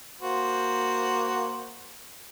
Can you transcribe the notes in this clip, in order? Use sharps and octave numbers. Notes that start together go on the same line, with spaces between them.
A#3 F#4 C5